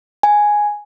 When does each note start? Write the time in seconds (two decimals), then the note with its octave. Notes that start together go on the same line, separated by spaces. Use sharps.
0.23 G#5